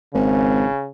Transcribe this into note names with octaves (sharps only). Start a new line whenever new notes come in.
G#1 C#3